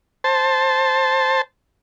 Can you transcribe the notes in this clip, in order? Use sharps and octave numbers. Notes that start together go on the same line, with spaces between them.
C5 A5